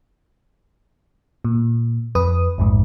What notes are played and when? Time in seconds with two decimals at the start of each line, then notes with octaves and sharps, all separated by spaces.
1.45 A#2
2.15 F2 B4 D#6
2.58 A#1 F2 G#2